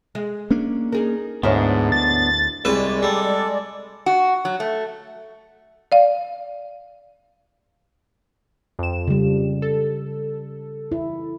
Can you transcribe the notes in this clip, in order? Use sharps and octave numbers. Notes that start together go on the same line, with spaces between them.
G#3
A#3 C#4 D4
D#4 G#4 A#4
D2 G#2 B3 D4 E4 A#4 C#5
A6
C2 G#3 G#4 B4 D5
G3 A4
F#4
F#3
A3
D5 F5
F2 E7
C#3 G3
A4
E4